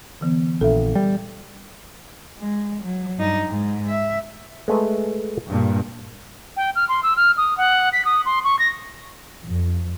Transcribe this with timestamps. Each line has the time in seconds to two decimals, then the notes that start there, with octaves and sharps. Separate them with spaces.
0.21 D3 E3 B3
0.61 A#1 A4 E5
0.95 G3
2.39 G#3
2.83 F#3
3.18 G2 D#4
3.48 G#2
3.89 E5
4.68 G#3 A3 B4
5.49 G2 A#2
6.57 G5
6.75 F6
6.89 C6
7.03 E6
7.17 F6
7.37 D#6
7.58 F#5
7.93 B6
8.05 D#6
8.26 C6
8.44 C#6
8.59 A#6
9.46 F2